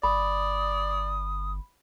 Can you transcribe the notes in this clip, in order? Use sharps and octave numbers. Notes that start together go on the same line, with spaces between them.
G1 D5 B5 D#6